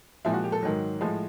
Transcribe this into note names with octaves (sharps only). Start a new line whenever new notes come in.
A#2 F3 G#3 E4
F#4
G4
A4
G#2 D#3 F#3
A2 F3 G#3